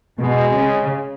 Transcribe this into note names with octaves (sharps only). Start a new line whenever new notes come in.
B2 G#3
C#3